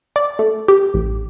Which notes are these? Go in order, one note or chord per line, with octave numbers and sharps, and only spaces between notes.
D5
A3
G4
A1